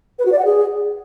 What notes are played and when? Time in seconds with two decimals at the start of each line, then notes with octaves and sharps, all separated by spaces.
0.19 B4
0.25 F#4
0.32 D5
0.38 F#5
0.45 G#4